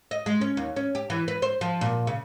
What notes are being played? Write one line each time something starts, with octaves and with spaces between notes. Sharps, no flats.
D#5
G#3
C#4
D#2
C#4
G4
E3
B4
C5
F3
A#2
C#3